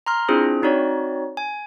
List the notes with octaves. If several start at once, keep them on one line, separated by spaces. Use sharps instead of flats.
A#5 C6 F6
C4 D4 E4 F4 G#4 C5
C4 D#4 F#4 C#5 D5
G#5